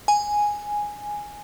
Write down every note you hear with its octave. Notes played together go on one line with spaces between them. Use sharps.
G#5